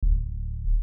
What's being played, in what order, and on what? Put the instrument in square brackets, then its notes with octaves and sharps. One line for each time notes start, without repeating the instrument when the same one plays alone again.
[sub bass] D1